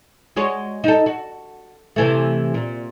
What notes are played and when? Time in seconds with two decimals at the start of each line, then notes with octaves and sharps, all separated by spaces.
0.36 G#3 F#4 C#5
0.84 D#4 A4
1.06 F#4
1.96 C3 E3 A3
2.54 A#2